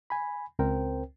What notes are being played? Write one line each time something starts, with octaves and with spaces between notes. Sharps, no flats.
G#5 B5
C#2 C4 A#4 C5 G5